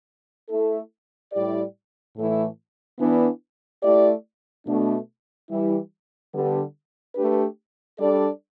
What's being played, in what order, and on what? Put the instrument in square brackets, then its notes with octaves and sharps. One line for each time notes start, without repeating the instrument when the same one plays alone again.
[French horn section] A3 E4 A4
A2 G3 E4 G4 D5
A2 E3 A3 E4 A4
E3 B3 D4
A3 E4 G4 D5
B2 A3 D4
E3 G3 E4
D3 G3 B3
A3 D4 G4 B4
G3 D4 A4 D5